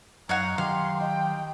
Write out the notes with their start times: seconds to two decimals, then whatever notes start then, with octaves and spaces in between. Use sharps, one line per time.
0.29 F#2 D#4 C#5 F5 F#5 A#5
0.58 D#3 F#3 G4 F5 F#5 C6 C#6
1.01 D#5 G5